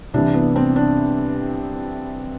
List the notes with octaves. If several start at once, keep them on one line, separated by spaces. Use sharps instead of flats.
C2 C3 E3 D4
B3
C4
D4